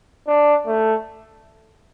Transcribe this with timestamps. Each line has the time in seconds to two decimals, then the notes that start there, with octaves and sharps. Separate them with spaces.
0.27 D4
0.67 A3